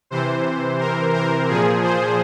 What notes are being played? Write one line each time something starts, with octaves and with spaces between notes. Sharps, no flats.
C3 E3 C5
A#4
A#4
A#2 F3 G#4
C5